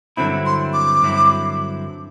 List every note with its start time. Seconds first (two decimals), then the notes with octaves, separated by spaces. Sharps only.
0.17 G2 D3 F#3 C4 E4 B5
0.46 C6
0.74 D6
1.02 G2 D3 F#3 C4 E4